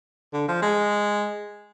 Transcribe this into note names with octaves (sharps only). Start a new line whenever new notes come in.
D3
F3
G#3